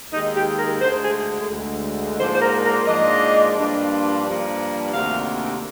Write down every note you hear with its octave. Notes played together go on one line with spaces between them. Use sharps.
D#2 D#3 G#3 D#4
G4
A#4
D2 D3 G#3 C5
G#4
D2 D3 G#3
G#2 F3 A#3 D4 C5
C5
A#4
A#4
G#2 F3 A#3 D4 D#5
G2 F3 A#3 D4
G2 F3 A#3 D4
D2 C3 D#3 A#3 D4 F5